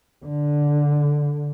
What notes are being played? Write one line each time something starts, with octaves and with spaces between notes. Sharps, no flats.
D3